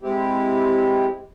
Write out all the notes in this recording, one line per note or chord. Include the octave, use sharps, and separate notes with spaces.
G#3 C4 E4 G4